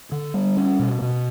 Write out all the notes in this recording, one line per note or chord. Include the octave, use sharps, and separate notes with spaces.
D3
G3
C#4
B2
B2